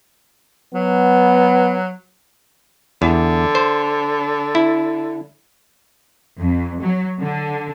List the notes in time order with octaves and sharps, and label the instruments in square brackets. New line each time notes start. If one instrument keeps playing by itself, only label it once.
[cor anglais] F#3 [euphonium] B3
[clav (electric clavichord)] E2 [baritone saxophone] D3
[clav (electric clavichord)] C5
E4
[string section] F2
F#3
D3